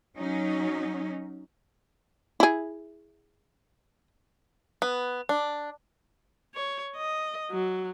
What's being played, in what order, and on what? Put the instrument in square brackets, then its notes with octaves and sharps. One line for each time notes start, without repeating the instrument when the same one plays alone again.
[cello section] F#3 C#4 D#4
[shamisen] E4 G#4
[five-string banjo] B3
D4
[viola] C#5
D#5
F#3